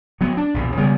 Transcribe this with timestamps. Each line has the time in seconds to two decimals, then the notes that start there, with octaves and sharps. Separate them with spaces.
0.21 F#3 B3
0.37 D4
0.54 B1 E2 A#2
0.77 C#3 G3 G#3 B3